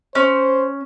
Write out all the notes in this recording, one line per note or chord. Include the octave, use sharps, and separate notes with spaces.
C#4 C5